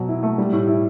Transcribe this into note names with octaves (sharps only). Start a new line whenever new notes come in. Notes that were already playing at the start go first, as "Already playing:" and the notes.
Already playing: B2 F#3
E4
A3
G3
A2
E4